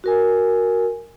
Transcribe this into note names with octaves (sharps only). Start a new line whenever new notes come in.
F#4 A#4 G#5